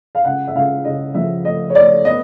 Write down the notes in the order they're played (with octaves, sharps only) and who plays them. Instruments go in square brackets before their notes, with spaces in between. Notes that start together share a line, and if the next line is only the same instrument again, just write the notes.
[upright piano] F5
C#2 F#5
E5
C#2 F5
C#3 D#5
F3 E5
A3 D#5
C#5
A3 D5
B3 D#5